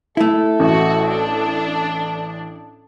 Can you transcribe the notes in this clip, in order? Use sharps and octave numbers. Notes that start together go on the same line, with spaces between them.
A3 E4 A4
A1 F#4
D4